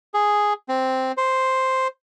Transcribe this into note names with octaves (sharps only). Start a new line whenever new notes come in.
G#4
C4
C5